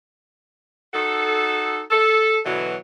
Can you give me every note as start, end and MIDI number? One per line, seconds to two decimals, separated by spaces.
0.94 1.82 63
0.94 1.82 66
0.94 1.82 69
1.91 2.39 69
2.45 2.75 47
2.45 2.75 50
2.45 2.75 52
2.45 2.75 54